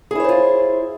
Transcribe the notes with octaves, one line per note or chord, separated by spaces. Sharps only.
E4 F4 G#4 C5 C#5